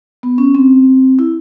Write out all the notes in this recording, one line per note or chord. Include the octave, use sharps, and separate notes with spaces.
B3
C#4
C4
E4